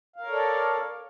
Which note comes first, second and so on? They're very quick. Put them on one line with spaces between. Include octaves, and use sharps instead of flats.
F5 A#4 C#5 A4 D5